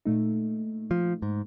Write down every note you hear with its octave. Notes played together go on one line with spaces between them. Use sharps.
A#2 A3 D#4
F3
G#2